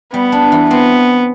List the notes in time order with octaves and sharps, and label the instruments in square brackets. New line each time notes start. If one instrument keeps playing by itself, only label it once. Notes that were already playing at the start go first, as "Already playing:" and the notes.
[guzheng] G3 [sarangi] B3
[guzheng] D4
E3
[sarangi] B3 [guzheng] C4